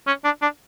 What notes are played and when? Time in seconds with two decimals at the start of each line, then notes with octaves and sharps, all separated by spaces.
0.07 C#4
0.24 D4
0.42 D4